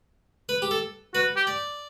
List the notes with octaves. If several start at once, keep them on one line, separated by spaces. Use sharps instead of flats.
B4
G4
A4
F#4 B4
G4
D5